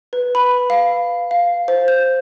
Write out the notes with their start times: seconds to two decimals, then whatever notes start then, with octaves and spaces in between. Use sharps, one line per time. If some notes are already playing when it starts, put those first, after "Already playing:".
0.13 B4
0.35 B5
0.70 F5
1.31 F5
1.68 C5
1.88 G6